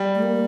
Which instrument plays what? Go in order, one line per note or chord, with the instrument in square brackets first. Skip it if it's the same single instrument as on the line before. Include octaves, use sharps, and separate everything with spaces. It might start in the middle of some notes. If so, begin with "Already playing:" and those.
Already playing: [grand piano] G3
[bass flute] A3
A#3